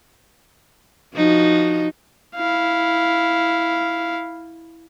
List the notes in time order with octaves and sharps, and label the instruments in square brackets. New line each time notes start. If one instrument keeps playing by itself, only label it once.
[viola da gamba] F3 D#4 F#4
[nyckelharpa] E4 F5